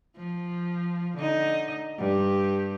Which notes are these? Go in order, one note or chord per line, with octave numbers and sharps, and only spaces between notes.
F3
D3 D#4 D#5
G2 G4